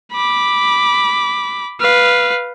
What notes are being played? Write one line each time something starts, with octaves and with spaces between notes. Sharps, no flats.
B5 D6
B4 F5